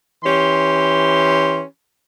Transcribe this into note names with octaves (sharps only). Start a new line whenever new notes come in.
E3 C#4 G4 C6